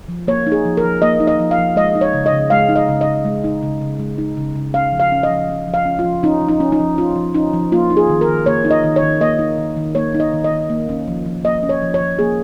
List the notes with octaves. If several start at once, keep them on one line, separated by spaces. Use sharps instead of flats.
F3
A#3 C#5
D#4
G#4
F3
A#4
F3
A#3 D#5
D#4
D#5
F3
F5
F3
G#3 D#5
D#4
C#5
C#3
D#5
C#3
G#3 F5
D#4
D#5
C#3
D#5
C#3
G#3
D#4
C#3
C#3
G#3
D#4
C#3
C#3
C#4 F5
F3
F5
C#4
D#5
F3
C#4
F3
F5
C#4
F4
F3
C#4 D#4
F3
D#4
C#4
D#4
F3
C#4 F4
F3
C#4 D#4
F3
A#3 F4
D#4
G#4
D#3
A#4
D#3
A#3 C#5
D#4
D#5
D#3
C#5
D#3
A#3 D#5
D#4
D#3
D#3
A#3 C#5
D#4
D#5
D#3
D#5
D#3
A#3
C#4
F3
F3
A#3 D#5
C#4
C#5
F3
C#5
F3
A#3 G#4